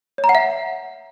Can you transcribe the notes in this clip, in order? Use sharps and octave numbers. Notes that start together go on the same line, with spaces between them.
C#5
A#5
F#5
E5